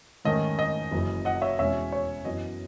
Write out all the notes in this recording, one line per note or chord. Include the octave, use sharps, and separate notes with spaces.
G#2 D#3 A3 C#4 D#5
D#5
F#1 F#2 E3
D#5 F#5
C#5 E5
E2 B2 G#3 C#4 C#5 E5
C#5
F#2 E3 B3 D#5